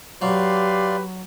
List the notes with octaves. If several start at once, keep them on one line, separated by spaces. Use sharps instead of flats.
F#3 G4 B4 D5 F5 C6